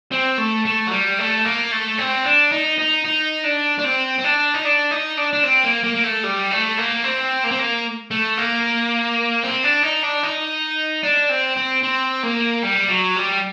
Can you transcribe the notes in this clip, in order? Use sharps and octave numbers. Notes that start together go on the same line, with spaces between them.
C4
A3
A3
F#3
G3
A3
A#3
A3
C4
D4
D#4
D#4
D#4
D4
D4
C4
C4
D4
D#4
D4
D#4
D4
D4
C4
A#3
A#3
A#3
A3
G3
A3
A#3
C4
A#3
C4
A#3
A3
A#3
C4
D4
D#4
D4
D#4
D4
C4
C4
C4
A#3
G3
F#3
G3